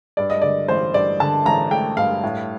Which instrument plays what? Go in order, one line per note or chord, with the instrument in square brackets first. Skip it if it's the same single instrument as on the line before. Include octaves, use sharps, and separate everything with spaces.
[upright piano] G2 D5
D#5
D3 D5
A1 C5
G2 D5
D3 A5
A1 A#5
A3 G5
G2 F5
A2